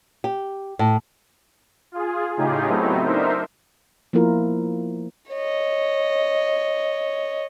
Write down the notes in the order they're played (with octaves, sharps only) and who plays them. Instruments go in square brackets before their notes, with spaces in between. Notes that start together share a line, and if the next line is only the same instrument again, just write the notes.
[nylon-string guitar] G4
A2
[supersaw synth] F4 G#4
A2 C#3 D#4 F4 G4 G#4
F#3 A3 B3 C4 D#4 E4
D4 D#4 A#4 C5 E5
[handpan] F3 A#3 B3 E4 F4 A#4
[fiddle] C#5 D#5